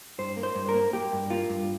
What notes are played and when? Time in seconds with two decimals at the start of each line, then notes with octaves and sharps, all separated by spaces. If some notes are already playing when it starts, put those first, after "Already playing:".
0.18 G2 C5
0.37 A#3
0.43 C5
0.55 G2
0.69 A#4
0.74 A#3
0.93 A#3 G4
1.13 G2
1.30 A#3 F4
1.50 G2